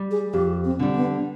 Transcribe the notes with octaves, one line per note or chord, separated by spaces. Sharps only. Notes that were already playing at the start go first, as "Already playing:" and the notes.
Already playing: G3
G#4
F2 G4
C4
D3 G3
B3